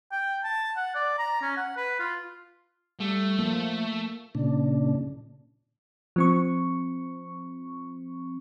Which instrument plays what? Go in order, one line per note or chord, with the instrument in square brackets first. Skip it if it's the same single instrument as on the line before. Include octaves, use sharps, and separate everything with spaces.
[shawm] G5
A5
F#5
D5
A#5
C#4
F#5
B4
F4
[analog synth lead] G3 [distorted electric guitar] A3
[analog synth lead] F3 [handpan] A#3
[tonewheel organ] A#2 C#3 D4
[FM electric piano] F3 C4 C#6